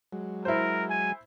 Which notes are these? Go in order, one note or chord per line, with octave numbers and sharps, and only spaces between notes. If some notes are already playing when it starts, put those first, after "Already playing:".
F#3 G#3
E4 A#4 C5
G#5